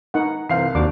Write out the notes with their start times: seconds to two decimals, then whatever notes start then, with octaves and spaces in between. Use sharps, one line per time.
0.14 D#4 A#4 F#5
0.49 C2 E3 C5 F5 C7
0.75 D#2 D4 F#4 C5 D6